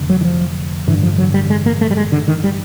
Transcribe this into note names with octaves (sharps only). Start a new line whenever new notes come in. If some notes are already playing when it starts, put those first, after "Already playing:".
Already playing: F1 F2 D3
F#3
E3
F3
A1 G2 D3 E3
F3
F#3
G3
G#3
A#3
A3
G3
G#3
D3
D#3
G3